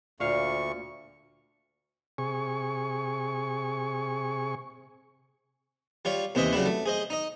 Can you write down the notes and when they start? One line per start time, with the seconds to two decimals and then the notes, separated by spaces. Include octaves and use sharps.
0.20 D2 A#2 F5 C#6
2.18 C3 G#4 C#6
6.05 G3 F4 C#5
6.35 D#2 C3 E3 C5 D#5 E5
6.53 C#3 F#3 G3 E4
6.66 A3
6.86 G#4 C5 D#5
7.10 D#4 D#5